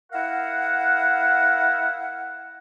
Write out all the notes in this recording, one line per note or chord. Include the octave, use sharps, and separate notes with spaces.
E4 A#4 F5 F#5